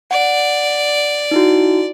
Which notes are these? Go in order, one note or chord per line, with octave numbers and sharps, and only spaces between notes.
D5 F#5
D#4 E4 F#4